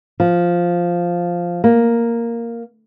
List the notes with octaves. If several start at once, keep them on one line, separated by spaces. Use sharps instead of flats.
F3
A#3